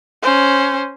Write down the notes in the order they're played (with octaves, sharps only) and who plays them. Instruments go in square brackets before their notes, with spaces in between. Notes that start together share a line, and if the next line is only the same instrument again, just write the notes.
[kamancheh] C#4 C5